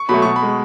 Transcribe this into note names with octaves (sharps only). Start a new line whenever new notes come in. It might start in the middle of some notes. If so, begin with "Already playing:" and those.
Already playing: C#6
B2 F#3 A3 B5
B2 C#6
B5
G#3